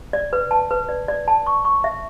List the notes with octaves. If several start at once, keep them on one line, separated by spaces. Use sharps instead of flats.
D5
B4
A5
B4
D5
D5
A5
C#6
C#6
E5